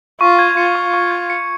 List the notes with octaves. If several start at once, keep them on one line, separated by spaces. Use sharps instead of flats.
F4 C#6
G#6
F4 C#7
C#6
C#6
G#6
C#7